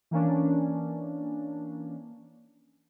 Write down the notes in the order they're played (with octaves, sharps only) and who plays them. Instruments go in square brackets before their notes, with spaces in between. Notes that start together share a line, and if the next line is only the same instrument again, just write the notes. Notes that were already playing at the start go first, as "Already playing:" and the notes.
[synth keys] E3 A#3 C#4 D4